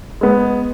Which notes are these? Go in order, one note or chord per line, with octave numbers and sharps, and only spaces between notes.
G#3 B3